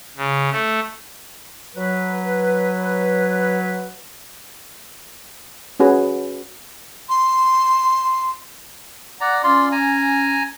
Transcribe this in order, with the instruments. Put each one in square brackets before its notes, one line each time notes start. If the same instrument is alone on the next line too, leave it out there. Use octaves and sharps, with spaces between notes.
[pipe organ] C#3
A3
[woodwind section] F#3 B4
[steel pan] C#4 F#4 G#4 B4
[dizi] C6
[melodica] D5 A#5 [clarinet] F#5
[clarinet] C#4 [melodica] F4 D5 C6
[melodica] G#5 A#5